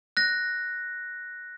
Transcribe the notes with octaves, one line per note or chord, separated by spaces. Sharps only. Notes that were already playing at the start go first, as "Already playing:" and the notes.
F#6 A#6